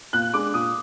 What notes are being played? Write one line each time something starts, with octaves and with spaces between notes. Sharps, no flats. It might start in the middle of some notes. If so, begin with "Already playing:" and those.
A#2 F#6
G#3 D4 D6
A#2 D#6